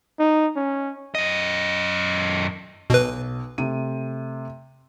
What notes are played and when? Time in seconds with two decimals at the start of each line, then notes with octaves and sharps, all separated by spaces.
0.19 D#4
0.56 C#4
1.15 F#2 D#5
2.90 B1 B2 B4
3.58 C3 A3 D#7